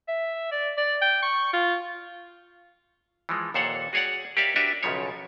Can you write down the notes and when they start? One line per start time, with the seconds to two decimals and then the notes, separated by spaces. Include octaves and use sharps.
0.08 E5
0.52 D5
0.78 D5
1.01 G5
1.22 C#6
1.53 F4
3.29 E3 F3 G#3
3.54 D#2 A#2 A4 C5 C#5 F#5
3.93 F#4 G#4 C#5 D5 F#5
4.37 G4 A#4 C#5 D5 E5 F5
4.56 D4 F#4 G4 A#4 B4 E5
4.83 B1 F#2 C#3 F3 C#5